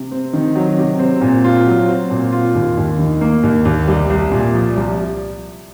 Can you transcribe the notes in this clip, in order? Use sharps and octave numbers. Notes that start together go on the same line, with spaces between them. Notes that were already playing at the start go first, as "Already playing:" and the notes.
Already playing: C3
C4
D#3
F#3
C3
C4
A#2
F4
F#3
C4
A#2
F4
D#2
D#2
D#3
A#3
D#2
D#2
C2
C2
A#2
F3
C2